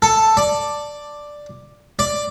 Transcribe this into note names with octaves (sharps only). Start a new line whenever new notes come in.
A4
D5
D5